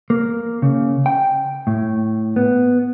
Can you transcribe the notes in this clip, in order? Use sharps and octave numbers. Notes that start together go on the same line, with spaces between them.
A#3
C#3
G5
A2
B3